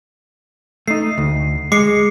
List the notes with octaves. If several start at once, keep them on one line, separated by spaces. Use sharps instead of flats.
A3 D#4 C7
D2
G#3 D6 C7 C#7